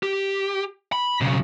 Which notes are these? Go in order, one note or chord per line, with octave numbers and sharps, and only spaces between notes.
G4
B5
B1 C#3